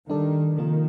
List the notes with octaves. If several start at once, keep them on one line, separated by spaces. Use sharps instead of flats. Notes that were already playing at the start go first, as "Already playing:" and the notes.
D#3 G3 D4 A4 D5
C3 D#3 F3 A#3 F4